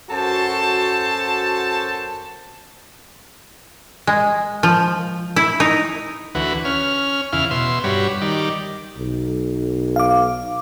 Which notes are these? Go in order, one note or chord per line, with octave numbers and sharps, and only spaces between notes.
F#2 F#4 A4 C5 A5
G#3
F3
E4
D#4
D2 E3 F#4 B4
C#4 F6
E2 C#3 E4 F5 F6
B2 E5 C6
G2 G3 F#4 C#5 B5
D#3 G3 D5
B1
F5 D6